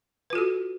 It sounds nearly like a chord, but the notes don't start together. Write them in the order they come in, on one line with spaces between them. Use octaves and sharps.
B4 F4 A4 F#4